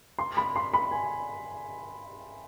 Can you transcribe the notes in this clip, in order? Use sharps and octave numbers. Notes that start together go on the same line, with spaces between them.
C6
B5
C6
B5
G#5